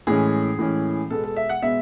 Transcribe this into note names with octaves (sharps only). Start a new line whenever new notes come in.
A2 E3 G#3 C#4 G#4
A2 E3 G#3 C#4
B2 G#3 B3 A4
A4
E5
F#5
B2 G#3 B3 E5